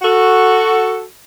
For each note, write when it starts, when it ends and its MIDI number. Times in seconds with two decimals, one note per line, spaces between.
0.02 1.05 66
0.02 1.05 69